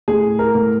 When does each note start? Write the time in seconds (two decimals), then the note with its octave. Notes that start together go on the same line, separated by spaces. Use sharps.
0.08 A2 G#4
0.39 A#4
0.55 A2